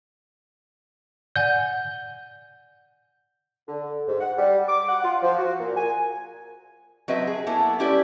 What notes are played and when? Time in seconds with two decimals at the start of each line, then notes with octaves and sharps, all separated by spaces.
1.36 D5 F#5 G#5 G6
3.68 D3
4.08 G#2
4.21 F#5
4.38 G3
4.68 D6
4.89 F#5
5.04 F4
5.23 F3
5.39 F#4
5.60 A#2
5.77 G#5
7.08 F#3 C4 B4 D#5 E5
7.27 G#4
7.46 F#3 A#3 B3 E4 A4
7.79 G3 C#4 E4 G4 B4 D5